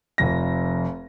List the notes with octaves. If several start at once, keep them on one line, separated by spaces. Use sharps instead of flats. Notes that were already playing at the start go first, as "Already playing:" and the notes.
F1 F2 A#6